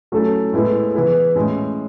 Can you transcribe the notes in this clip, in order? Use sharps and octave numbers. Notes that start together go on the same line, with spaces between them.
F#3 A3 C#4 E4 A4
A2 G#3 B3 E4 A4
E3 B3 E4 G#4
A2 G#3 C#4